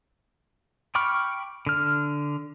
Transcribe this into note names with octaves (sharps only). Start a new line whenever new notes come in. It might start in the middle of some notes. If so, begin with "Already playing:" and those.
G5 B5 C#6 D6 F6
D3 F6